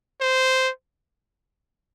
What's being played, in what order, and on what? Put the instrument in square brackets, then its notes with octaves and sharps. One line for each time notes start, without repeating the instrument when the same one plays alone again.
[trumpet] C5